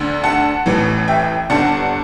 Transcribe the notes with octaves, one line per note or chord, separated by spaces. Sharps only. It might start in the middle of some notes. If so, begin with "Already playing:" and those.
Already playing: D2 D3
F#5 A5
A1 A2 E3
E5 G5
G1 G2 D3 F#5 A5